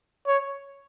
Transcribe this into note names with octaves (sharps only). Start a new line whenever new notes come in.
C#5